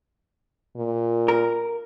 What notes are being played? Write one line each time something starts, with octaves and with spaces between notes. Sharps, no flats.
A#2
A#4